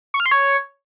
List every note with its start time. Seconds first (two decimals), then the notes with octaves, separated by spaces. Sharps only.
0.14 C#6
0.20 F6
0.26 C6
0.31 C#5